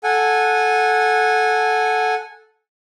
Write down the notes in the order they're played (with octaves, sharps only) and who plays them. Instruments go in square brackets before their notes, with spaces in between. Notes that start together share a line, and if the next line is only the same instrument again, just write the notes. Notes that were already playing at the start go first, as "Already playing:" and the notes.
[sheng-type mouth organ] A4 F#5 G#5